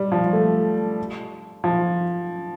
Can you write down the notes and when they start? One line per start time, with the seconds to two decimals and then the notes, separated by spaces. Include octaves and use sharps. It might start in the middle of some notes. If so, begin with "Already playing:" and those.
Already playing: G3
0.12 F3
0.33 A3
1.64 F3